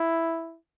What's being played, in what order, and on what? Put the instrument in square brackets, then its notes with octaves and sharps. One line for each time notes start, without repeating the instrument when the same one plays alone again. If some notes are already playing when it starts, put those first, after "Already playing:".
Already playing: [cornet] E4